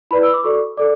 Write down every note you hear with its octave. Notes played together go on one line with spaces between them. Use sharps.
E4 B4 D5 B5
E6
D6
F#4 A4 D5 C#6
A4 D5 D6